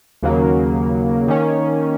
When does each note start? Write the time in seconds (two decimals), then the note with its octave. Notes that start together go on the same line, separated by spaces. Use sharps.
0.23 D#2 C#3 F#3 A#3
1.28 D#3 A#3 C#4